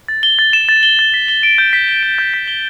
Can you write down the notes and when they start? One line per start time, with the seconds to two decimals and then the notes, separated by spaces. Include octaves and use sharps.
0.08 A6
0.23 G7
0.39 A6
0.53 E7
0.69 A6
0.83 G7
0.99 A6
1.14 B6
1.28 G7
1.43 D7
1.58 G6
1.73 B6
1.88 G7
2.03 D7
2.18 G6
2.34 B6
2.48 G7